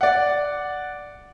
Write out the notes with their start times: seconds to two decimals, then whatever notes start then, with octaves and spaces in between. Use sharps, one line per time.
0.01 D5 F#5